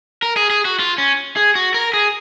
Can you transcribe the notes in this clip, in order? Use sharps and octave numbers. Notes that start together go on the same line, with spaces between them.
A#4
G#4
G#4
F#4
F4
C#4
G#4
F#4
A#4
G#4